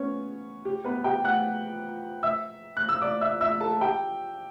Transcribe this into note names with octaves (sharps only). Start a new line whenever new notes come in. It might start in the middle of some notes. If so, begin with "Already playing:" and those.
Already playing: B3 C#4 C#5
G4
B3 B4
G4 G5
F#5 F#6
E5 E6
F#6
E6
D5 D6
E5 E6
E5 E6
A4 A5
G4 G5